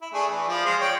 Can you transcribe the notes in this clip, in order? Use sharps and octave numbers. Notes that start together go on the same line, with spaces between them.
E4
A3 D4 G#4
E3
F3 F4 D5
G#3 F4 C5
C#5 D5 G5